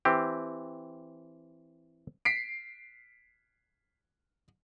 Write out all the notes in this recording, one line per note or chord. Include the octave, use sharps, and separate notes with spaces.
E3 C4 G4
B6 C7 D7